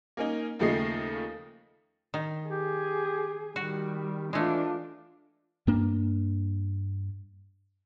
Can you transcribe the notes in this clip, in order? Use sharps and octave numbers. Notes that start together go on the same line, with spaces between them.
A#3 C#4 D#4
D#2 C#3 F3 A3 D#5 C7
D#3
G4 G#4
D#3 G3 F#4
E3 G#3 A3 D4 F4
G2 A#3 D4